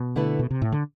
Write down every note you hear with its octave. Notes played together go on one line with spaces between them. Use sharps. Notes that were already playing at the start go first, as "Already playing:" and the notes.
Already playing: B2
D3 A3 E4 B4
B2
C3
A2
D3